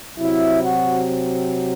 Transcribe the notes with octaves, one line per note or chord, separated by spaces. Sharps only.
C3 F#3 C4 E4
F#4